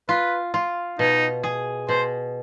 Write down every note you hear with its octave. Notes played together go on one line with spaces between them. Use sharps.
F4 B4
F4
B2 D#4
G#4
B2 C5